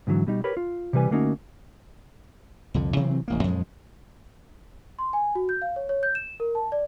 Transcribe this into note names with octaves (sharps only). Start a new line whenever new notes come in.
G#2 D3 E3 F#3
B2 G3 D#4
G4 A#4 B4 C#5 B5
F4
C3 E3 G3 B4 G#5
D3 A3 A#3 C#4 D#4 F#4
C2 F2 D3
C3 E3 F#3 C4
E1 A1 A#3
F2 A#2 F3 G#3
C6
G#5
F#4
G6
F5
C#5
C#5
G6
E7
A#4
A5
D5